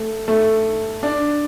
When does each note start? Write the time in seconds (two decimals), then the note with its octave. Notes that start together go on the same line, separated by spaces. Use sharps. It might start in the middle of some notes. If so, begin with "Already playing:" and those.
Already playing: A3
0.28 A3
1.03 D4